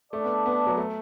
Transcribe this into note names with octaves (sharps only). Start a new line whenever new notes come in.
A3 D4 A4 D5
B3
B3
F#3
A3